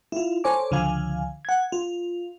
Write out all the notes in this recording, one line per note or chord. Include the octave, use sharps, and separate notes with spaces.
E4 F4
A4 C5 C#5 G#5 D6
C#2 D3 F3 F5 G#5
F#5 G#6
F4